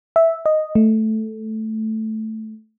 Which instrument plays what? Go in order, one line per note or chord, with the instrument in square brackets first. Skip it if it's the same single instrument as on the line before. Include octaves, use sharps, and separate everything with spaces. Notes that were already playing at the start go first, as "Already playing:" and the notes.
[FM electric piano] E5
D#5
A3